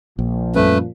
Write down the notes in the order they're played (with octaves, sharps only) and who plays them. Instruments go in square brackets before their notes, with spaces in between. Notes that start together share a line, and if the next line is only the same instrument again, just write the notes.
[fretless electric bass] A#1 [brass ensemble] A#2 F3
[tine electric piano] F#2 G3 C#4 [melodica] A3 B4